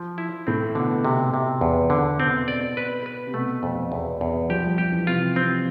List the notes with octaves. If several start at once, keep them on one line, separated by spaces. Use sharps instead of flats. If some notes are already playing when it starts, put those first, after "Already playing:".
Already playing: F3
E4
A2 C4
B2 D3
C3
C3
E2
D3
B2 C4
D5
B4
B4
C3
B2 A3
F2
E2
E2
F3 G4
G3
F3 G4
E3
C3 F4
C4